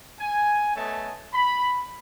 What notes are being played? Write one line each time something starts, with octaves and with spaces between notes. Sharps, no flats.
G#5
A3 B3 C#5 D#5 G#5 A5
B5